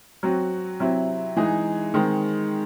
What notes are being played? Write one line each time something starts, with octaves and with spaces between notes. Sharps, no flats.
F#3 C4 F#4
C3 F#3 C4 E4
E3 G#3 D#4 G#4
D#3 G#3 C4